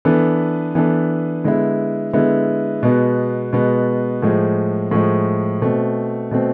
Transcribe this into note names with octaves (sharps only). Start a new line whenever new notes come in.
E3 B3 D4 A4
E3 B3 D4 A4
D3 G#3 B3 E4
D3 G#3 B3 E4
B2 G#3 B3
B2 G#3 B3
A2 F3 G#3
A2 F3 G#3
B2 A3 C4
B2 A3 C4